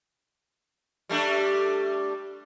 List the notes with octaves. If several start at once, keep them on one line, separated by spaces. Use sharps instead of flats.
G3 A3 D4